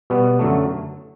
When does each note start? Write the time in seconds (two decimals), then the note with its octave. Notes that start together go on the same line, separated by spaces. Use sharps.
0.10 B2 G3 B3
0.39 F#2 D3 F#3 A3